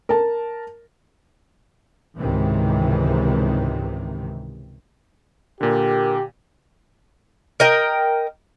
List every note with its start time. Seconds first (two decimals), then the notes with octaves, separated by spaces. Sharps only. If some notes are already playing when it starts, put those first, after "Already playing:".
0.09 A#4 A5
2.18 C#2 G#2 C3 D#3 E3
5.61 A#2 D3 G4 A#4
7.60 A#4 D#5 G5